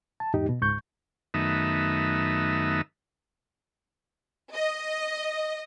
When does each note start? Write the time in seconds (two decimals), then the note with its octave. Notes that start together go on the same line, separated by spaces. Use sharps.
0.20 A5
0.34 E2 G#2 D#4 G4
0.49 B2
0.61 C#2 G#2 C#6 G6
1.34 F#2 D#3 A3 B3 D#4 E5
4.54 D#5